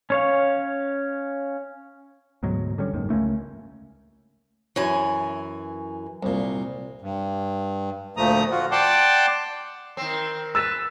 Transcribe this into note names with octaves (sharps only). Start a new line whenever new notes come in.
C#4 C#5 F5
D2 G#2 B2 F#3
D3 G3 C#4
F#1 D#2 G#2 D#3
C#2 A3 A#3 C#4
F#2 E3 G#5
C2 A#2
G2
D2 A#2 F3 A3 A#5 D#6
F4 F#4
D5 F#5 G5 A5 C6 D6
D#3 C4 C6
B4 E6 A6 E7